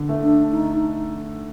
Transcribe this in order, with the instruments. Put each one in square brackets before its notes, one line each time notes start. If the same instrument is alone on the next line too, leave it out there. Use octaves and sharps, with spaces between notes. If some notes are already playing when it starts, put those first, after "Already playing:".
Already playing: [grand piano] D3
A3
[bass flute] D4
D#4